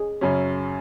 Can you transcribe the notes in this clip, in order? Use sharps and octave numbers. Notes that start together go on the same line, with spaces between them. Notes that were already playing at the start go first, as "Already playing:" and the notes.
Already playing: G#4
F#2 C#3 F#3 C#4